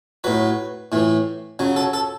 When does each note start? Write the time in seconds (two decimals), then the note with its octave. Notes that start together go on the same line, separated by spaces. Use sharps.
0.24 A2 F#3 B4
0.92 A2 E3
1.59 C#3 F#3
1.76 A4
1.93 A4